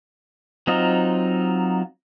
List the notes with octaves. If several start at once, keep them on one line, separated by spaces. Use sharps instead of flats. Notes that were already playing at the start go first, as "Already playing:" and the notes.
F#3 C4 D#4 F4 D#5